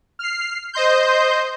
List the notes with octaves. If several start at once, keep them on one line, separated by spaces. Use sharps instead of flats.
F6 C7
C5 D#5 C6 G6